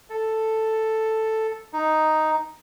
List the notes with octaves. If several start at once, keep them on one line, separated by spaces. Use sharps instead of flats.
A4
D#4